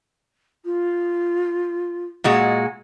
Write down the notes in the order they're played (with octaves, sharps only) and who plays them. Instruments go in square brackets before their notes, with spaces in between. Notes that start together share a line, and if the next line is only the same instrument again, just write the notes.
[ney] F4
[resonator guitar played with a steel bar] A#2 G#3 F#4